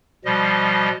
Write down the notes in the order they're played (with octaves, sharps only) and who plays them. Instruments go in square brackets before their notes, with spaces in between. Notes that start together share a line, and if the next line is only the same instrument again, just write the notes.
[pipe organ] B2 F3 G3 D#5